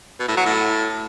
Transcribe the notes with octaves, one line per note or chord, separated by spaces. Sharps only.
B2
A2
F#3
A2